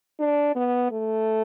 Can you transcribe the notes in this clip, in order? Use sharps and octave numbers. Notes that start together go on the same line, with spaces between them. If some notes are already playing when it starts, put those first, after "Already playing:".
D4
B3
A3